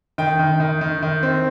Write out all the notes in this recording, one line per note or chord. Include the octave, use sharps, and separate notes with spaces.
D#3 G5
D#3
D#3
D#3
D#3
C4